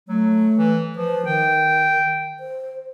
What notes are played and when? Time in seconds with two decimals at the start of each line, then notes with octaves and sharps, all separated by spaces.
0.08 F#3 A3
0.57 E3
0.96 F3 B4
1.26 D#3 G5
2.40 C5